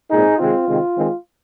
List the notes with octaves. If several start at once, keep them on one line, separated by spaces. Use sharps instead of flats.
A#2 G#3 C4 D#4 G#4
C3 D#3 G#3 C4 F4
C3 D#3 G#3 C4
D#3 G#3 C4